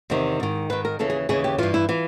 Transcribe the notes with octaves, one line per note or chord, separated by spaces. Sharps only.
E2 C3 D#3
G#2 D#3
G#2 D#3 B4
A#4
D#2 C#3 E3 A4
G#4
D#2 C#3 E3 G#4
G4
G2 E3 F4
E4
E3 F4